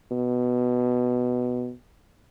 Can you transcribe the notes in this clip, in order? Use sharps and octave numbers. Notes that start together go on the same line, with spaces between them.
B2